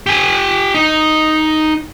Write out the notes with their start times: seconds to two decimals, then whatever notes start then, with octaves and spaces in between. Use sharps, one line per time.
0.07 G4 G#5
0.75 D#4